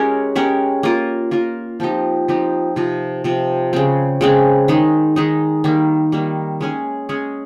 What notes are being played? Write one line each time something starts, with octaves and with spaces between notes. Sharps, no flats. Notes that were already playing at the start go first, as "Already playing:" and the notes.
Already playing: G#3 C#4 G4 A#4
G#3 C#4 G4 A#4
A#3 F4 A#4
A#3 F4 A#4
F3 C4 D#4 G4
F3 C4 D#4 G4
C3 F3 C4
C3 F3 C4
C#3 G#3 C4
C#3 G#3 C4
D#3 G#3 D#4
D#3 G#3 D#4
D#3 G3 A#3
D#3 G3 A#3
G#3 C#4 G#4
G#3 C#4 G#4